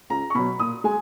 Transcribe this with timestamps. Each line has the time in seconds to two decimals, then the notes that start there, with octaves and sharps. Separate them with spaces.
0.10 C#2 A#5
0.30 C#6
0.35 B2 F#3 B5
0.59 A#2 D#6
0.84 G#3 G#5